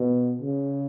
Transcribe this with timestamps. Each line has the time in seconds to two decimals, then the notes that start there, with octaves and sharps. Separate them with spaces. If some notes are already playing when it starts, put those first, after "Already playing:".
Already playing: B2
0.42 C#3